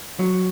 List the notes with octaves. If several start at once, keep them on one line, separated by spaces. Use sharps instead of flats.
F#3